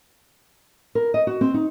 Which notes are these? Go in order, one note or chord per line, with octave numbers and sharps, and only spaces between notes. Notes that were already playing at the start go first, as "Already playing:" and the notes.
A#4
D#5
F#4
C4
D#4